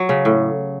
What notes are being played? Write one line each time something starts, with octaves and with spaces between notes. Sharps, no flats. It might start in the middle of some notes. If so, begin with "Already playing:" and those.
Already playing: F#3
C#3
A2